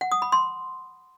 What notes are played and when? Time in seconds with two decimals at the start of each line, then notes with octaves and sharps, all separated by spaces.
0.01 F#5
0.12 D#6
0.22 B5
0.32 C6